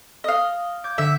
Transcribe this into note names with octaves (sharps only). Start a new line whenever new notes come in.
D#5 F5
D6 G6 G#6
D3 E5